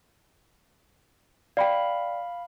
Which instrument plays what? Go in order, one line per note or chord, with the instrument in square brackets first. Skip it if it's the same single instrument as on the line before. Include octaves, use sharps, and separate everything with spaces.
[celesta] D5 G5 [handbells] F5 B5